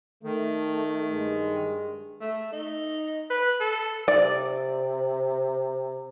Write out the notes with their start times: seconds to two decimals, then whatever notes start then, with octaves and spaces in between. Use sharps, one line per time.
0.23 D#3 A3
1.11 G2 G#3
2.21 A3
2.52 D#4
3.30 B4
3.60 A4
4.08 C3 D5